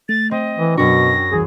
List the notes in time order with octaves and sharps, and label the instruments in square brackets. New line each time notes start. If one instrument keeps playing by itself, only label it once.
[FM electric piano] A3 [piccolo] A6
[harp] C4 [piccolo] D#5
[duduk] E3
[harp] F#2 C#6 [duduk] B2 [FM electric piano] D4 F#4 G5 [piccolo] A#6
[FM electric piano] C2 G2 E3 [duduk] G#4